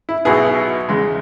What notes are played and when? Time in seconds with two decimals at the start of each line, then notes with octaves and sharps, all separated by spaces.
0.09 E4
0.25 B1 B2 B3 E4 G#4
0.89 E2 C#3 G#3